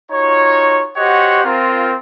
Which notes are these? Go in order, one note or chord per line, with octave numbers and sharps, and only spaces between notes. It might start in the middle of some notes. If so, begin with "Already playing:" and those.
D#4 F4 F#4 C#5
F#4 G4 C5 C#5 D#5 F#5
C4 F4 A#4